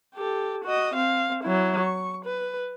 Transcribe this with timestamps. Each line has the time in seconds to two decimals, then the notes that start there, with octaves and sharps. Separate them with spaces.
0.15 G4 A4
0.64 F#4 D#5
0.94 C4 F5
1.44 F#3 E4
1.80 C#6
2.25 B4